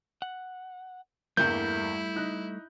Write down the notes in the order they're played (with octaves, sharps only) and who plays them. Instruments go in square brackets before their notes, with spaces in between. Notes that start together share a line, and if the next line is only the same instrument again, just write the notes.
[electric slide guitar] F#5
[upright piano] E2 G2 A#3 [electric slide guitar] G3 A3 [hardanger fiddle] E4 [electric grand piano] G6
[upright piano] D#4 F#6